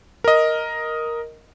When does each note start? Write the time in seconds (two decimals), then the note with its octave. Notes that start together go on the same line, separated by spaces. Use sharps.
0.24 A#4 D#5